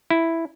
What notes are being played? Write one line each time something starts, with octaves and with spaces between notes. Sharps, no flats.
E4